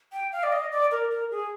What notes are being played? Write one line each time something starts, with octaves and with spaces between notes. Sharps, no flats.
G5
F5
D5
D#5
D5
A#4
A#4
G#4